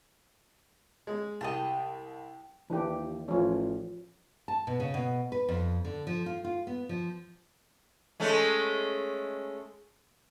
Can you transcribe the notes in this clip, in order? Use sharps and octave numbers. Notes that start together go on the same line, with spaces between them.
G#3 G#4
C2 G4 D#5 G5 A5
D#2 E3 D4 G4
A1 F3 C#4
A5
B2
C#3
B2
B4
F2
D3
F3
F4
F4
B3
F3
G#3 A3 C#4